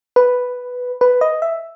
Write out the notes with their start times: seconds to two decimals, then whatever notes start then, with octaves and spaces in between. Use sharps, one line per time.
0.16 B4
1.01 B4
1.21 D#5
1.42 E5